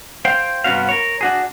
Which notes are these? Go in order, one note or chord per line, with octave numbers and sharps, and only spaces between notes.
C5 F5 G5
G2 C3 B3 C#4 F#4 F5
A#4 C#5
D4 F#4 G#4